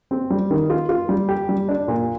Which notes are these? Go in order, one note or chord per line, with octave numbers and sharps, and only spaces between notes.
C4
G3
D#3
F4
F4
G3
G4
G3
D4
A#2